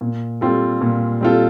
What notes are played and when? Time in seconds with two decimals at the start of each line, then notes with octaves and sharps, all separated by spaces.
0.01 A#2
0.41 G3 C4 F4 A4
0.81 A#2
1.21 G3 C4 F4 A4